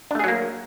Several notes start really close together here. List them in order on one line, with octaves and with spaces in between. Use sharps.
D4 A3 G#4 F#3 A#3